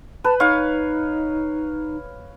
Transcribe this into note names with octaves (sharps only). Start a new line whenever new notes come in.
B4 A5
D#4 C#5 F5 C#6